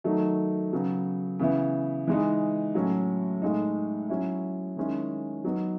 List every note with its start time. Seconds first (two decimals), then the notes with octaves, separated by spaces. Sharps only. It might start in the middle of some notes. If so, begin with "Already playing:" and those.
0.04 D#3 F#3 A3 D#4
0.72 C#3 F#3 B3
1.39 C#3 E3 B3 E4
2.07 E3 G#3 D#4
2.75 A2 F#3 C#4
3.42 A2 G#3 D#4
4.09 F#3 C#4 E4
4.77 D#3 G#3 C#4 E4
5.44 F#3 B3 D#4